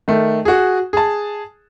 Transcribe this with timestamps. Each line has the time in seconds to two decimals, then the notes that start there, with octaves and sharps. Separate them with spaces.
0.08 D#3 A3
0.45 F#4 G#4
0.93 G#4 A5